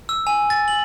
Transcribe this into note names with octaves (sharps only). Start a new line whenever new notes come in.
E6
G#5
A6
F#7